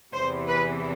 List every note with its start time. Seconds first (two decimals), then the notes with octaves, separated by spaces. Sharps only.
0.14 E2 C3 E3 C5
0.48 B4